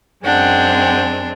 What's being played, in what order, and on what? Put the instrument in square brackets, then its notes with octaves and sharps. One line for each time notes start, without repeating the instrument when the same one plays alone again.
[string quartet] F#2 G#3 C4 [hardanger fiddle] D4 [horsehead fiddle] F#5 G5